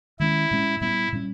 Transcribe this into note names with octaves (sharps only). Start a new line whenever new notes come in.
D#3 G#3 C#4 E4
A#2 G#3 C#4
A#2 G3 B3 E4
A#2 G3 C#4